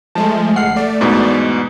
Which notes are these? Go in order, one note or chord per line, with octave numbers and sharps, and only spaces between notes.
F3 G#3 A3 A5
G1 F#5 F6 C7
A3 D5
E2 G#2 B2